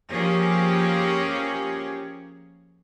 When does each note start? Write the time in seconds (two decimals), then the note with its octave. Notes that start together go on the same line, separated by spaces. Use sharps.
0.11 F3 A#3 C#4 G4 G#4 C#5